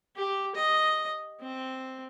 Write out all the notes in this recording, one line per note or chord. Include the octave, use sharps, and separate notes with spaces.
G4
D#5
C4